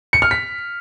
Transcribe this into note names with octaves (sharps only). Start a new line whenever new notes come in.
C#7
F6
B6